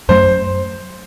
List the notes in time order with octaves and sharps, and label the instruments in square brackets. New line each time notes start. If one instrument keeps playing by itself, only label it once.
[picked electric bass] F#2 F#3 A3 [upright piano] C5